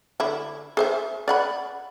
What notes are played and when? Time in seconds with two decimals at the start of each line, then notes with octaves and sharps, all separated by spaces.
0.20 D3 E4
0.77 G#4 C5 E5
1.28 D5 F#5 B5